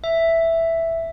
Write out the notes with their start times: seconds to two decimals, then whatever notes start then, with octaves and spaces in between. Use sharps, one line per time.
0.04 E5